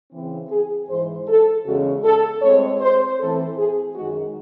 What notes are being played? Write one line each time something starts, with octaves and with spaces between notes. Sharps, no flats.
C#3 E3 C4
G#4
G#2 E3 G#3 C5
A4
E2 C#3 G#3 C#4 F#4
A4
A2 G#3 C4 C#5
C5
A2 E3 C4 A4
G#4
F#2 D#3 G#3 F#4